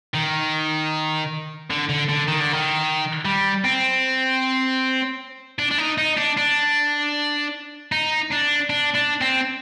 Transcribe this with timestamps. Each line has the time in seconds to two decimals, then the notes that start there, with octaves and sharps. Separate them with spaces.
0.15 D#3
1.70 D3
1.89 D3
2.09 D3
2.28 D#3
2.41 D3
2.53 D#3
3.25 G3
3.65 C4
5.59 D4
5.71 D4
5.78 D#4
5.98 D#4
6.17 D4
6.37 D4
7.92 D#4
8.31 D4
8.70 D4
8.95 D4
9.21 C4